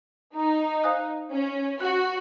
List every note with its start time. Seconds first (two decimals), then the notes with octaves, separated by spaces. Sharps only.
0.35 D#4
0.83 C5 F5 G#5 D#6 F#6
1.32 C#4
1.81 F#4 F#5 C#6 F#6